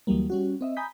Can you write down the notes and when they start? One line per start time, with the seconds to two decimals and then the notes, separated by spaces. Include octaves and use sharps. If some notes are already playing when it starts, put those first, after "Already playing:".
0.07 D2 E3 F#3 G3 A#3
0.30 G3 C#4 F#4
0.61 C4 D#5 E5
0.77 G#5 A#5 B5 D#6 G6 B6